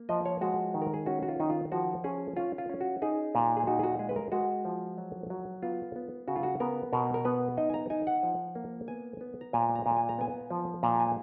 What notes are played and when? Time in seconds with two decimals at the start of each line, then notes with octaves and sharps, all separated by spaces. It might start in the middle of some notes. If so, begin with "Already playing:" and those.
Already playing: A#3
0.09 F3 D#5
0.26 C#5
0.41 G#3 F#4
0.74 D#3
0.82 A#4
0.94 G#4
1.06 C#4 F#4
1.23 F#4
1.29 F4
1.40 D#3 D#4
1.50 F4
1.72 F3 F#4
2.04 C#4 G#4
2.37 C#4 F4
2.58 F4
2.70 C#4
2.81 F#4
3.02 D#4 G#4
3.35 A#2
3.57 G#4
3.67 D#4 F#4
3.79 G#4
3.83 F#4
3.99 G#3 G#4
4.09 B4
4.16 A#4
4.32 G#3 F#4
4.65 F3
4.98 F#3
5.30 F#3
5.63 B3 F4
5.96 B3
6.28 C#3 F#4
6.36 F4
6.43 F#4
6.60 B3 A#4
6.93 B2 A#4
7.14 A#4
7.25 B3 B4
7.57 D#4 D#5
7.70 G#5
7.74 A#5
7.90 D#4 G#5
8.07 F#5
8.23 F3
8.55 A#3
8.88 B3 G#5
9.21 B3
9.41 A#5
9.53 A#2 G#5
9.75 A#5
9.86 A#2
9.96 G#5
10.09 A#5
10.18 B3 G#5
10.50 F3
10.83 A#2 A#5
11.00 G#5